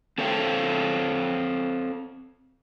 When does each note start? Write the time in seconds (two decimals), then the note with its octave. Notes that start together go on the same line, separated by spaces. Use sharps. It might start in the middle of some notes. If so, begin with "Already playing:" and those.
0.18 C4 A4 C5 C#5 F5 G5